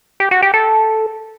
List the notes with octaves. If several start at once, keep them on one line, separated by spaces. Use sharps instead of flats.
G4
F#4
G4
A4